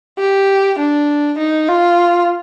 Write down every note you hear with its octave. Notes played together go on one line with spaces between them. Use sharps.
G4
D4
D#4
F4